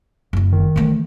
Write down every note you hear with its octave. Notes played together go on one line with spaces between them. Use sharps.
F#1 E4
D#3
E3 A3